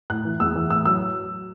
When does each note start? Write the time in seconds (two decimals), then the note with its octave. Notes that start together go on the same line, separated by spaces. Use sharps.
0.10 A2 F#6
0.25 E3
0.40 E2 E6
0.55 E3
0.70 A2 E6
0.85 F#3 E6